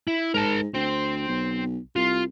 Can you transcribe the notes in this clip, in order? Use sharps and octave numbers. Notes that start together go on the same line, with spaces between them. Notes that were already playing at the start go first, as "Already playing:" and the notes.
E4
G#2 A#4 A5
D2 C4
B1
C2 F4